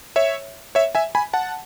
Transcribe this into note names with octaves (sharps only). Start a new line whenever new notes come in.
C#5 E5
C#5 E5
E5 G#5
G#5 B5
F#5 A5